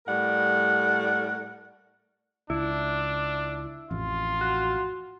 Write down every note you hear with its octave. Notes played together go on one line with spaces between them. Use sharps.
A2 G3 A#4 D5 F#5
C#2 D4 E4
A1 F2 F4
F#4